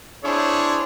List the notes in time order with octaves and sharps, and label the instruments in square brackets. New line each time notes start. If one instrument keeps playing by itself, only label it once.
[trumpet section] C4 D4 E4 G#4 C5 C#5